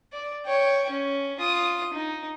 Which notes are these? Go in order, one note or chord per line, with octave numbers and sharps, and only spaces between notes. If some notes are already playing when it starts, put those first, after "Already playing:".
D5
C#5 G5
C#4
F4 D#6
D#4